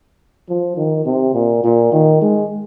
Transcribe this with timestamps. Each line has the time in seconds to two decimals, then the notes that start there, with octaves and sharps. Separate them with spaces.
0.49 F3
0.77 D#3
1.06 C3
1.34 A#2
1.64 A#2
1.92 D#3
2.21 G#3